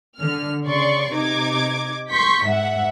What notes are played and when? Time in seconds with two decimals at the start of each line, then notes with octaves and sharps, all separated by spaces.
0.19 D3 F6
0.66 C#3 D5 C6 C#6
1.13 C3 D#4 D6 G#6
2.11 C6 C#6 G6 B6
2.45 G#2 E5 F#5